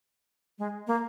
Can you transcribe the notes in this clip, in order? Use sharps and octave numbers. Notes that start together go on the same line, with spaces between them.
G#3
A#3